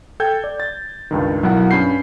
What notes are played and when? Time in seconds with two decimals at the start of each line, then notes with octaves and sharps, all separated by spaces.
0.20 A4 G5 G6 G#6
0.44 D5
0.60 A6
1.11 C#2 G2 D#3
1.43 B1 F#3 E4 A#4 F#5
1.71 G2 C#4 B5 G6 C7